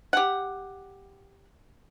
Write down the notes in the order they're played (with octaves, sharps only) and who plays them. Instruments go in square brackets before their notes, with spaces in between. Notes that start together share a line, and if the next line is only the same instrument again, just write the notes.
[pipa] G4 F#5